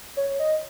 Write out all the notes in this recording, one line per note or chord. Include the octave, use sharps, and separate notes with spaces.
C#5
D#5